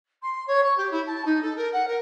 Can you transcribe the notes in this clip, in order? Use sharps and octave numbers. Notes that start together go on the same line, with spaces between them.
C6
C#5
C#6
G4
E4
A5
D#4
A4
A#4
F#5
A#4